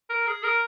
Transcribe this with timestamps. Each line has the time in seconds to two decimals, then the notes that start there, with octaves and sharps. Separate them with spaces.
0.10 A#4
0.27 G#4
0.43 A#4